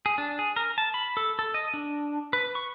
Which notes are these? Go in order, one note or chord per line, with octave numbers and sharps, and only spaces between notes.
G#4
D4
G#4
A#4
A5
B5
A4
A4
D#5
D4
B4
C#6